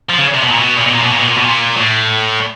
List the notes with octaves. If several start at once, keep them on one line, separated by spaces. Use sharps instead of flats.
F3
C#3
C3
B2
A#2
B2
A#2
B2
A#2
B2
A#2
B2
A#2
B2
A#2
A2